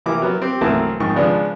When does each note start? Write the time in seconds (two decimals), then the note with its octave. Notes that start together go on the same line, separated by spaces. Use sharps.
0.06 C3 E3 A#3 D6
0.22 F#3 B3 A#4
0.42 C4 G4
0.61 B1 E3 A3 A#3 C4 A5
1.00 F2 G#2 D#3 C#6
1.16 C#3 F3 G#3 B3 D4